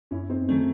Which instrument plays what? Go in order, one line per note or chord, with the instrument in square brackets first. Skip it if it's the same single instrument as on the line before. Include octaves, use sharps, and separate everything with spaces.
[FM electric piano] F#2 [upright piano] C#4 E4
[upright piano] C4 D#4
[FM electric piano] D#3 F#3 C4 [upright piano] A3 C#4